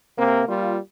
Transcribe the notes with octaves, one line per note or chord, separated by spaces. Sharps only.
C3 A#3
G3 A#3 F4